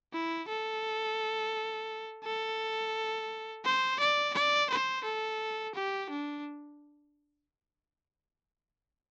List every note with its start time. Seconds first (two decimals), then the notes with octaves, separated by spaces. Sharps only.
0.13 E4
0.48 A4
2.24 A4
3.65 C5
4.00 D5
4.34 D5
4.70 C5
5.04 A4
5.75 G4
6.10 D4